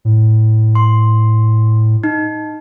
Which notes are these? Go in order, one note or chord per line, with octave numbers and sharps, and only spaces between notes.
A2
C6
D#4